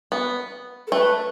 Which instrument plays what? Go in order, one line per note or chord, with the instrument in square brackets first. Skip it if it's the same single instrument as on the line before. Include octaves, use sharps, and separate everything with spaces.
[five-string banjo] B3
[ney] A4
[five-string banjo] A3 [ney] B4